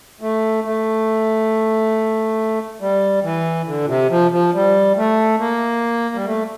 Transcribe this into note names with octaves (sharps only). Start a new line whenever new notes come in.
A3
A3
G3
E3
D3
A#2
C3
F3
F3
G3
A3
A#3
G3
A3